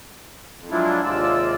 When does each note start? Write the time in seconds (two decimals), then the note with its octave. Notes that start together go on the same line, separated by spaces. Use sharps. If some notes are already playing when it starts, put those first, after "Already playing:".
0.57 F2
0.70 F3 F#3 G#3 D4 E4 F4
1.04 D#2 C3 G#3 F4 D5 E6